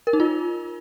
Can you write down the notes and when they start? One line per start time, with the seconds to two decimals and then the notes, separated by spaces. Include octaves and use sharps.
0.07 A#4
0.13 D#4
0.20 F4